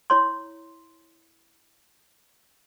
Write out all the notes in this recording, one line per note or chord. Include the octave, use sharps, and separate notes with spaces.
E4 C#5 C6